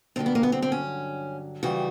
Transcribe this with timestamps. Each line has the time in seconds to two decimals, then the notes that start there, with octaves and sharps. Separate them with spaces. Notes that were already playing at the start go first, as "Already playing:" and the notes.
0.16 G2 D3 F#3 A#3 C4
0.26 B3
0.35 A#3
0.43 B3
0.52 C4
0.62 C4
0.72 C#4
1.63 F2 C#3 E3 G3 F#4